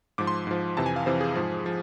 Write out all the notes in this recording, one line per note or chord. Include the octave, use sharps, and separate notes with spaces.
G#2 F3 D6
C6
G#2 F3
F2 C3 E3 A5
G#5
F5
F2 C3 E3 C5
G#4
G#2 F3
F3